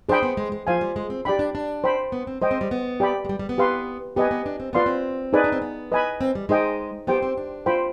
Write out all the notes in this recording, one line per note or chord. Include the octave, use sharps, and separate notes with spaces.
D4 G#4 C5 G5 B5
B3
G#3
G#3
F3 F4 C5 F5 G#5
G3
G#3
C4
D4 G4 D5 G5 B5
D4
D4
C5 G5 B5
B3
C4
G#3 C5 D#5 G5
C4
G3
B3
G4 D5 G5 B5
G#3
G3
G3
B3
G4 B4 F5 C6
B3 G4 B4 D#5 G#5
B3
D4
C4
B3 F4 B4 D5 F5 C6
C4
D#4 G#4 B4 D5 G#5
D4
C4
B3
B4 D#5 G#5 B5
C4
G3
G#3 D#4 G#4 C5 D#5 G5
B3 G4 C5 G5
C4
D4
F4 C5 G5 B5